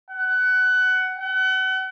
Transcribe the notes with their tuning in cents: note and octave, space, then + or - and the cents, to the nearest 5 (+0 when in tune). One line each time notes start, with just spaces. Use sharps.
F#5 +20
F#5 +35